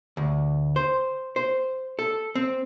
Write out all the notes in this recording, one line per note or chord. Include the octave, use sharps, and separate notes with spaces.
D2
C5
C5
A4
C4